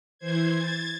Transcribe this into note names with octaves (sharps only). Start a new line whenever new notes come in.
E3 C5 G#6
G#6 A6